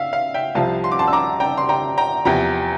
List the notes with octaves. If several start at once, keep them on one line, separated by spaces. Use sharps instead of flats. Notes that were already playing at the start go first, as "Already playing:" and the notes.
Already playing: E5 F5
F5
E5 G5
C2 C3 F3 F5 A5
C6
D6
A5 C6
E6
A#5 D6
G5 A#5
C6
G5 A#5
G5 A#5
E2 C3 F3 G5 A#5